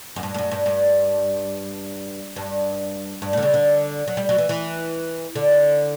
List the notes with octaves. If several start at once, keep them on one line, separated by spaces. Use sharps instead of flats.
F#2
G2
G2
F#2
G2
G2
G2
G2
A2
D3
C#3
D3
F#3
G3
F#3
E3
E3
D3